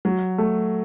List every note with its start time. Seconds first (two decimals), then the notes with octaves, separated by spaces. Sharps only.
0.05 F#3
0.38 A3